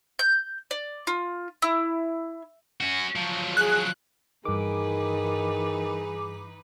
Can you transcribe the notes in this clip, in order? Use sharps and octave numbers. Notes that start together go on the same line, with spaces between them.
G6
D5
F4
E4
C#4 F#4
F3 F#3
G#4 F#6
G2 D#3 E3 D#4 G#4 B4 D6